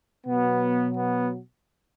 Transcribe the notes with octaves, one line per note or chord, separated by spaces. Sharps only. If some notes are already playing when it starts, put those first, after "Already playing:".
B2 F#3 B3
B3